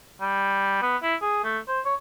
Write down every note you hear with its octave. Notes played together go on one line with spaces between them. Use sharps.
G3
B3
E4
G#4
A3
C5
C#5